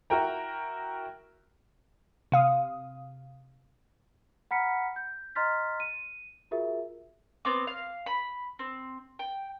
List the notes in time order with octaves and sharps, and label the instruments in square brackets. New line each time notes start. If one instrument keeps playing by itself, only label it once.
[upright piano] E4 F#4 A#4 G5 A#5
[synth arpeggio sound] C3 F5 D#6
[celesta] F#5 A#5 B5 F6 B6 C#7
G6
D#5 A#5 C6 F6 A6 B6
D#7
F4 F#4 G#4 A#4 E5
[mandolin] B3 C4 D6
F5
B5
C4
G5